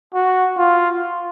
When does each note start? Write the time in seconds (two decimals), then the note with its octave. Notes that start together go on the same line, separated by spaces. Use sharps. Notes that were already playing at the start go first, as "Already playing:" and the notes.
0.14 F#4
0.58 F4